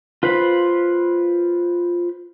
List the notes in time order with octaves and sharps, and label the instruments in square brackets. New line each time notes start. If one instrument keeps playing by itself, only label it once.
[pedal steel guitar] F4 B4 C5 B5